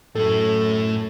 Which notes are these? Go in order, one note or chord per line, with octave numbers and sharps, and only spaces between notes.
F#2 A2 A3 A4